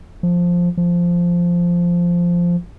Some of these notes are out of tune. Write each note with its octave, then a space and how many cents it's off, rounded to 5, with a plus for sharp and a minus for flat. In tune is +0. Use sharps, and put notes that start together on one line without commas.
F3 +5
F3 -5